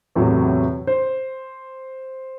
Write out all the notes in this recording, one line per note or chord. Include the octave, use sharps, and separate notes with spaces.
E2 A2 C3 F#3
C5